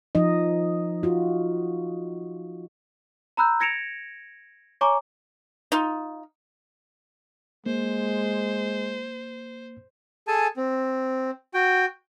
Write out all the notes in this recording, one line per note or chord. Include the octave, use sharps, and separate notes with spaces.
F3 D#4 D#5
F4 F#4
A#5 B5 E6 F#6 G6
G#6 A#6 C#7 D7 E7 F7
C#5 G#5 A#5 C#6 D6
D#4 F4
G#3 A#3 C5
G#4 A4 G#5 A5
C4
F#4 G5